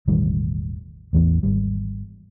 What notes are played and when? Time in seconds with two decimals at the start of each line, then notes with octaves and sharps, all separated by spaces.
0.08 E1 A1 D#3 G3
1.13 A1 E2 E3 B3
1.43 G#1 G3